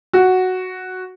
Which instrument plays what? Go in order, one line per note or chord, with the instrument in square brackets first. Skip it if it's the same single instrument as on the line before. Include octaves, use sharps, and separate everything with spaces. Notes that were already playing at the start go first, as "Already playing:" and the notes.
[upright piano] F#4